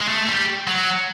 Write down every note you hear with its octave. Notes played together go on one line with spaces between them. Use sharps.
G#3
A3
G3
F#3